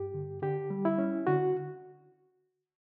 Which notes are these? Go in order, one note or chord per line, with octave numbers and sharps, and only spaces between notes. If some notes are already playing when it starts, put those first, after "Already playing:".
Already playing: G2 G4
D3
D3 G4
G3
E4
C#4
D3 F#4